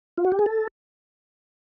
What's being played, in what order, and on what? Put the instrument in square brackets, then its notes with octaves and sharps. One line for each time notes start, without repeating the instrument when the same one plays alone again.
[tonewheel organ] F4
F#4
G4
G#4
A4